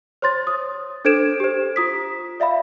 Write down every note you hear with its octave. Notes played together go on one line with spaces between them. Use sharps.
C5 C#5 C6 A6
D#6
D4 A4 C5 G#6 D7 E7
G4 C5
F4 D#6 B6
D5 E5 F5 B5